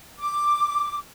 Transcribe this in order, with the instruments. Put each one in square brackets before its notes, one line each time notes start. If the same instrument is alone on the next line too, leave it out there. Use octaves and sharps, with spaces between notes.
[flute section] D6